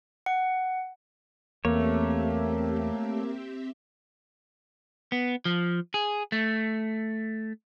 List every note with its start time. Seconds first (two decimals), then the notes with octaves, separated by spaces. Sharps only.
0.26 F#5
1.65 E2 A3 A#3 C4 G4 C#5 E5
5.12 B3
5.45 F3
5.94 G#4
6.32 A3